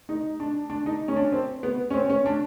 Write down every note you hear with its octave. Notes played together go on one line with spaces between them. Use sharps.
D#4
D4
D4
D#4
C#4
D4
C4
B3
C#4
C4
C#4
D4